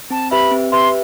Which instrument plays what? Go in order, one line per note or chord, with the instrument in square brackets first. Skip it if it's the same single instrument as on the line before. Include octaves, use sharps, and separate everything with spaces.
[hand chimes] C4 [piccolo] A5
[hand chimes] G4 B4 E5 [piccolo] B5
[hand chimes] C4
[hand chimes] G4 B4 E5 [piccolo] C6